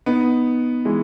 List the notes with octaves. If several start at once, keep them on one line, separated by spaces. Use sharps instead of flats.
B3 D#4
E3 G#3